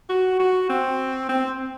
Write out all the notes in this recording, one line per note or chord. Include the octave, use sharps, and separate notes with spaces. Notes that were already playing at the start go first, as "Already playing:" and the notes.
F#4
F#4
C4
C4